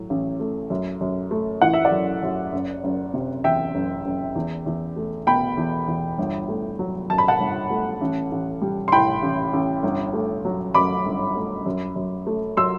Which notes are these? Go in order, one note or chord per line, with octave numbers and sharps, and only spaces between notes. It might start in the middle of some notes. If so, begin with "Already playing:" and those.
Already playing: A2 F#3
A1
A3
F#2
F#2
A3
E3 F#5
E5
D5 F#5
F#2
F#2
F#1
F#1
C3
E2 E5 G5
F#1
F#1
E2
E2
A3
B2 G5 B5
E2
E2
G1
A3
F#3
F#2 A5
B5
F#5 A5
G1
A3
A1
A1
G3
C6
A2 G5 B5
A1
A1
G1
A3
F#3
F#2 B5 D6
G1
A3
F#2
F#2
A3
F#3 C6 E6